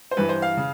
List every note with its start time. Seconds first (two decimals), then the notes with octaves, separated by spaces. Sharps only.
0.11 C5
0.17 G2 E3 B4
0.29 C5
0.42 F5
0.57 C#3